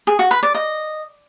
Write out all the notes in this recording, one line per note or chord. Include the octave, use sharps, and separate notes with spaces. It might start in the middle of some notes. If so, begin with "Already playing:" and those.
G#4
F#4
B4
D5
D#5